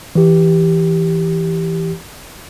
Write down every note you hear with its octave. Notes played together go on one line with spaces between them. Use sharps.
E3 G4